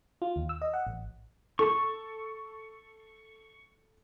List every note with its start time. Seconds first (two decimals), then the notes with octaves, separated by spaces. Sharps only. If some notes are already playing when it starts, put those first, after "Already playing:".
0.22 F4
0.36 D#2
0.49 E6
0.62 D#5
0.74 F#5
0.87 A1
1.59 A4 C#6